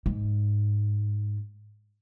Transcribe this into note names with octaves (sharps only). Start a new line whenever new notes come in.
G#2